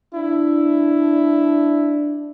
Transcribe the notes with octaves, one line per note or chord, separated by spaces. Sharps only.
D4 E4